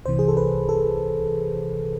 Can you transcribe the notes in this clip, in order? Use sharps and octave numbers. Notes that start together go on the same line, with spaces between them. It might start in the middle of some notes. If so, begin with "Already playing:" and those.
C2 C3 E3 C5
G#4
A4
B4
A4